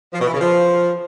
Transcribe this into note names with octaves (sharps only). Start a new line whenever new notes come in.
F3
B2
E3
C#3
F3